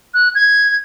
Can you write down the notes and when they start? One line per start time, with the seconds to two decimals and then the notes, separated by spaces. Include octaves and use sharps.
0.14 F#6
0.35 G#6